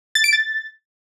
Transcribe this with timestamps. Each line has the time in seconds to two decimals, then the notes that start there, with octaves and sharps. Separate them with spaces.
0.15 A6
0.24 D7
0.33 A6